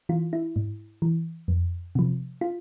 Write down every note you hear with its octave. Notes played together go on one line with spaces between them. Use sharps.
E3 F4
E4
G#2
E3
F2
C3 F3
F4